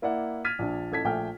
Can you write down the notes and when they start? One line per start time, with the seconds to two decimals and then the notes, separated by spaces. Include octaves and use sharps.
0.02 A#3 E4 D5 F#5
0.45 F6 G#6 A6 B6 D#7
0.59 A#1 D4
0.92 A1 A4 G#6 B6
1.04 A#1 A3 G5 G#5 F6